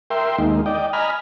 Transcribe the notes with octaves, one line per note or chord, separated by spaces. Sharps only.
A#4 E5 G5 C6
D#2 G#3 A#3 D#4
D5 D#5 G5
D#5 G#5 A#5 B5 F6